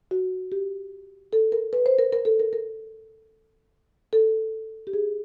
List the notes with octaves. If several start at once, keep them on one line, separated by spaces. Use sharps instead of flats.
F#4
G4
A4
A#4
B4
C5
A#4
A#4
A4
A#4
A#4
A4
G4
G#4